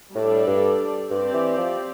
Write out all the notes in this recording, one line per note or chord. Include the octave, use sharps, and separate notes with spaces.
A2 G3 D4 A4 D5
G2
G2 C4 G4 D5
E3
F3